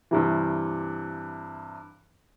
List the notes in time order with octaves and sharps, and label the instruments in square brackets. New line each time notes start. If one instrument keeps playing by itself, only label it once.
[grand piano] G2 C3 E3